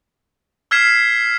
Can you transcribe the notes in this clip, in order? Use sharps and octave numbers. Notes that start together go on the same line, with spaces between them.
E6 F6 G#6 B6 C7 E7